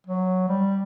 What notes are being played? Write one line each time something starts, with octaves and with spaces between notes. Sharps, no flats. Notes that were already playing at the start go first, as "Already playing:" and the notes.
F#3
G3